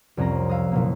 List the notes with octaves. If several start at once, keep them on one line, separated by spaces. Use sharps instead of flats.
C2 F2 C#4 A#5 A#6
D#5 F5 E6
F#1 B2 A#3